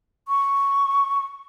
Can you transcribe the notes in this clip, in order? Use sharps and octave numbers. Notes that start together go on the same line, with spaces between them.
C#6